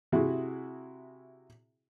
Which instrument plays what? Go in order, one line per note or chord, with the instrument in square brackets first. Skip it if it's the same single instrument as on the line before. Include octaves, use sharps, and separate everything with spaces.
[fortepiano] C3 E4 F#4 G#4